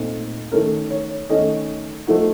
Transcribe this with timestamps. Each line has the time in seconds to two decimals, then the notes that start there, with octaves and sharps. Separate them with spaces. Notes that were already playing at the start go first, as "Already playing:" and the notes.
Already playing: A#2 A3 C4 D#4
0.52 D#3 A3 C#4 A#4
0.91 C#5
1.30 D#3 A3 C#4 D#5
2.07 F3 A3 D#4 F#4